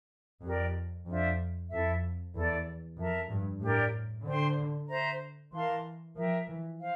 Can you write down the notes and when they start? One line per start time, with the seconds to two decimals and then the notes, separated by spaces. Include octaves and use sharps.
0.43 F2 G4 A#4 D5
1.07 F2 D4 F4 C5 E5
1.70 F2 E4 A4 E5
2.35 E2 E4 A4 D5
2.98 F2 A#4 E5 A5
3.30 G2
3.61 A2 D4 G4 A#4 D5
4.25 D3 C5 G5 C6
4.88 C5 E5 A#5
5.53 E3 A#4 F5 A5 C6
6.16 F3 A#4 E5 G5
6.48 E3
6.80 C5 F5